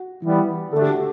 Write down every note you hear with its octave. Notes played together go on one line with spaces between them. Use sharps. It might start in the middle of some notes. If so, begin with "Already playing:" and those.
Already playing: F#4
E3 G3 B3
D3 A3 D4 A4
G4
F#4